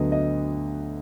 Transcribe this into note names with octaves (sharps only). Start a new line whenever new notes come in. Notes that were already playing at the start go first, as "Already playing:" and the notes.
Already playing: D2 D3 F#3 B3 D#5
D#5